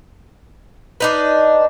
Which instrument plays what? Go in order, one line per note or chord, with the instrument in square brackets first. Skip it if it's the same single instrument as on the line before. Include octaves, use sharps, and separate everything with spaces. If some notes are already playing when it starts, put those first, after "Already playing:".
[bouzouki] D4 D#4 B4